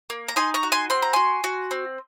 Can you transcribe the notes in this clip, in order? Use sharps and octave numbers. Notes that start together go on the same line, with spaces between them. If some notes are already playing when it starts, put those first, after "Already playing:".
A#3
A#5
D#4 G#5 C6
A#5 C#6
F#4
G#5 C6
C4 C6
A#5
F#4 G#5 C6
F#4
C4